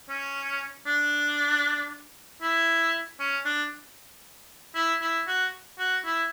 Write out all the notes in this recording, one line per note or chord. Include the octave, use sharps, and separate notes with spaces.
C#4
D4
E4
C#4
D4
E4
E4
F#4
F#4
E4